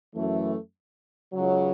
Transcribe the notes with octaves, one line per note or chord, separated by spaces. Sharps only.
F#2 E3 A3
C#2 C#3 F#3